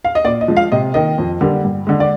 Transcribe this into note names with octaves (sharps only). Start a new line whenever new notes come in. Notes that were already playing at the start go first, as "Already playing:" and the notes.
F5
D#5
A#2 D5
D#5
F3 G#3
F5
C3 D#5
D#3 A#3 D#5
F2
D3 G3 A#3
G2
D3 G#3
D5